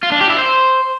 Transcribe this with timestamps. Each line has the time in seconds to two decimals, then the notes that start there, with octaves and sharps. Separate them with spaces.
0.03 F4
0.12 D4
0.21 G4
0.30 E4
0.39 C5